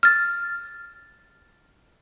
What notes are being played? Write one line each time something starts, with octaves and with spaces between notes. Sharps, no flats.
F6 A6